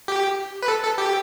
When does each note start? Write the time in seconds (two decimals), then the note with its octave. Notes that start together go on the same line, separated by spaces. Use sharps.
0.08 G4
0.62 B4
0.68 A4
0.83 A4
0.98 G4